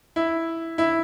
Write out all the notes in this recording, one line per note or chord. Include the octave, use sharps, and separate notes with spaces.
E4
E4